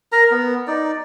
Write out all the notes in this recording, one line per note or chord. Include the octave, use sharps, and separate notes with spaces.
A#4 A#5
B3
D#4 D5